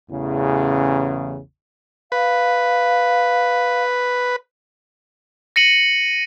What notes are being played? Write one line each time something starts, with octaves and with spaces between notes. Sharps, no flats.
A1 E2 C#3
B4 F5
A#6 C#7 D#7 F#7